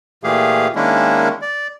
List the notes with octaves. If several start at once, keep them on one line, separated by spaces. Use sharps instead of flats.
A#2 E3 A3 G4 G#4 F5
D#3 G#3 A#3 C#4 D4 E4
D5